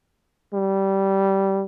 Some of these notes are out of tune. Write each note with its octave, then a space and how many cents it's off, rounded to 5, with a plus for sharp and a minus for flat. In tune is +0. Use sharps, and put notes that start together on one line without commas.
G3 -15